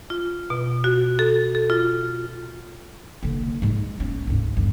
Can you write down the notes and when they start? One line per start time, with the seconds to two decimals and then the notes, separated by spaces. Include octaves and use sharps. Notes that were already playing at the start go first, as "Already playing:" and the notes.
0.10 F4
0.50 B2
0.84 F#4
1.19 A4
1.55 A4
1.70 F4
3.23 D3 A#3
3.48 D3
3.62 G#2 G#3
4.00 A#3 C#4
4.27 D2 G#2
4.57 G1 D#2